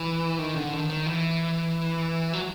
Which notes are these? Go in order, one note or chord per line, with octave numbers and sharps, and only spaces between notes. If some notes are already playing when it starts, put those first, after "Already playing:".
Already playing: E3
D#3
D3
D#3
D#3
E3
F#3